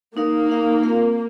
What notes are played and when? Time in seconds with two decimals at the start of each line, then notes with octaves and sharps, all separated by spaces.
0.17 A#3 D#4 A#4 F5
0.50 D#4 A#4 F5
0.83 C4 F4 A#4 F5